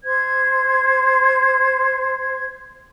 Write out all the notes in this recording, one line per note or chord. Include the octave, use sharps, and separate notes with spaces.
C5 G#6